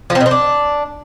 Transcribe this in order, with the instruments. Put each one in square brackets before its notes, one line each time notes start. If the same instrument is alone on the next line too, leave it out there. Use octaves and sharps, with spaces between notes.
[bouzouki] F3
C4
B2
C4
D4